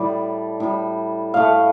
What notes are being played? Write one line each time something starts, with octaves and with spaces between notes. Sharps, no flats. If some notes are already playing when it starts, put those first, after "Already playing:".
Already playing: A2 G3 D5
A2 G3
A2 A3 F5